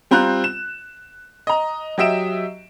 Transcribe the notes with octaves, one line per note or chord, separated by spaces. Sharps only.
G3 C4 F4 A#5 F#6
E7
D#5 A#5
F#3 G4 D#5 E5 D7 E7